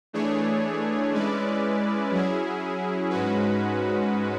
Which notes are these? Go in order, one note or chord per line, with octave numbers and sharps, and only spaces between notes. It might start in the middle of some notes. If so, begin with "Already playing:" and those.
E3 A3 D4 G#4 C#5
G#3 C#4 E4 B4 D5
F#3 C#4 E4 G#4
G#2 G#3 C#4 F#4 B4